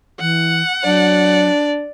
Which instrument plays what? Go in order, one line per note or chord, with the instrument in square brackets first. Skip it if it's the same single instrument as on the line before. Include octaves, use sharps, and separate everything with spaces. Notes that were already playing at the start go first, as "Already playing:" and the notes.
[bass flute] E3 [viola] F#5
[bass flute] F#3 [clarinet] D4 [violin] D5